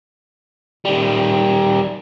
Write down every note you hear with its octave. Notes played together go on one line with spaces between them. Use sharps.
D#3 G3